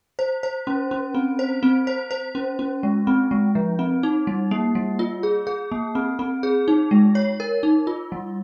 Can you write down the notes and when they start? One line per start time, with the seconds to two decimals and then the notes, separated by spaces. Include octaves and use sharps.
0.19 C5
0.43 C5
0.67 C#4
0.91 C#4
1.15 C4
1.39 C5
1.63 C4
1.87 C5
2.11 C5
2.35 C#4
2.59 C#4
2.83 G#3
3.07 C4
3.31 G#3
3.55 F3
3.79 C4
4.03 D#4
4.27 G3
4.51 A#3
4.75 G3
4.99 F4
5.23 G#4
5.47 G#4
5.72 A#3
5.95 C4
6.19 C4
6.43 G#4
6.68 D#4
6.91 G#3
7.15 C#5
7.40 A#4
7.63 D#4
7.87 F4
8.12 G3